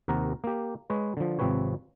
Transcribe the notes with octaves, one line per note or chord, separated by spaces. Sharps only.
D#2 C3 A#4 F#5 A#5
A#3 G4
G#3 B4 C#5
D3 F3
G#1 C3 F3 C4 B4 C#5